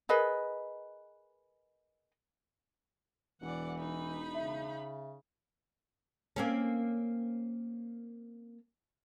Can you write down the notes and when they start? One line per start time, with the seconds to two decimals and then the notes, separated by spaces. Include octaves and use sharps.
0.09 G#4 A#4 B4 D#5
3.41 E1 E3 D5 F#5
3.78 D#4 B5
4.35 C#3 E5
6.36 A#3 C4 C#4